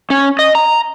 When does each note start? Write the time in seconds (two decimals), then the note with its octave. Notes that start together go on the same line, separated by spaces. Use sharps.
0.10 C#4
0.39 D#5
0.55 A#5